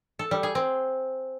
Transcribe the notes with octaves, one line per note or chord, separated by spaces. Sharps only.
A4
G3
G#4
C4